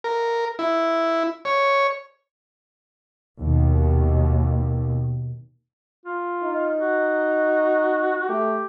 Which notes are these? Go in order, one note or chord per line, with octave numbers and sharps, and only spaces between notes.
A#4
E4
C#5
D#2 B2
F4
D#4
F#4
A3 G4